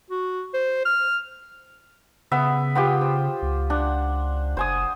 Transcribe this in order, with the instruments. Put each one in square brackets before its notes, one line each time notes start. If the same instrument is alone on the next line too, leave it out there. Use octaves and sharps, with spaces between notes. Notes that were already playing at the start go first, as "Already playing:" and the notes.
[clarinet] F#4
C5
F6
[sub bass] C#3 [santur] B3 E5
[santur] B3 F4 G4
C5
[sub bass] C#2
[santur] D4 F#5
[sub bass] F#1 [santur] C5 G#5 D#6